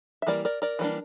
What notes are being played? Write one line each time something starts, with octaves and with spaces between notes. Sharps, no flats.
E5
E3 G3 A#3 A#4 D5
A#4 D5
A#4 D5
E3 G3 A#3 D4